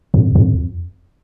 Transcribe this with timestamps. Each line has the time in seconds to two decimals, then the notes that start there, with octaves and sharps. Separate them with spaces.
0.14 F2
0.35 F2